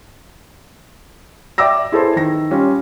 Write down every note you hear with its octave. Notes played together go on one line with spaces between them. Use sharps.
D5 E5 G5 D6 E6 A#6
E4 G#4 A4 B4 C5
D#3 A#6
G3 C#4 F4